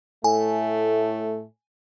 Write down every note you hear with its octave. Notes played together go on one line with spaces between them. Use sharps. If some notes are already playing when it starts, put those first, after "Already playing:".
A2 A3 G#5